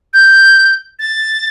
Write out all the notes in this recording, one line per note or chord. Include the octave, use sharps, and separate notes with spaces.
G6
A6